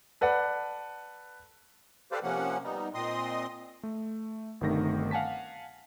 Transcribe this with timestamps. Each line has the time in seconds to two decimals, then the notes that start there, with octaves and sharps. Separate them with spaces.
0.21 A4 B4 D5 F#5
2.12 G4 A4 B4 C5 D5 F5
2.23 C3 F3 A#3 C#4 F#5
2.64 G3 B3 D#4
2.94 A#2 C4 D#5 C6 D#6
3.83 A3
4.61 G1 G2 C3 D#3 A3 A#6
5.11 F5 F#5 G#5 A5 B6